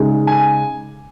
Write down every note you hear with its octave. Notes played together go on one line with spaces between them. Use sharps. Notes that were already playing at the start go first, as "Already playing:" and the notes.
Already playing: C#3 G#3 D#4
G#5